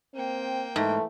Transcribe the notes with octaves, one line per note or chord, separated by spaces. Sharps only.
A#3 C4 G5
G#2 E3 A3